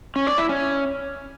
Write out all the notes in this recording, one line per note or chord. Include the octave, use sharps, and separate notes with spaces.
C#4
D5
E4
C#4